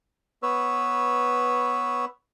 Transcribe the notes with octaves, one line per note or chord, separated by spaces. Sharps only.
B3 B4 C#5 E6